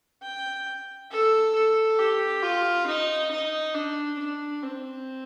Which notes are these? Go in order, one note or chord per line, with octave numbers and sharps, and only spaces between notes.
G5
A4
A4
G4
F4
D#4
D#4
D4
D4
C4